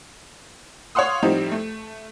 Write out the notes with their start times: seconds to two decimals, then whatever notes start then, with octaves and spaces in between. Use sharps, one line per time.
0.95 C#5 F5 F#5 C6 D#6
1.22 A2 F3 G3 C4 D#4
1.51 A3